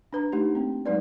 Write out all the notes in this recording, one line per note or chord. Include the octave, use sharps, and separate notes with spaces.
D4 B4 A#5
A3 D#4 G4
A#3 C4
F#3 G#3 D#4 B4 D5